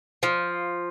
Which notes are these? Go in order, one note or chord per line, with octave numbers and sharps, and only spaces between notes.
F3